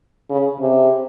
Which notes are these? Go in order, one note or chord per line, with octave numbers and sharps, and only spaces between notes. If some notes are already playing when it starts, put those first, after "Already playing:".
C#3
C3